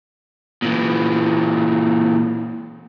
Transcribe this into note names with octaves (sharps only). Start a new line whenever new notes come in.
A#2 E3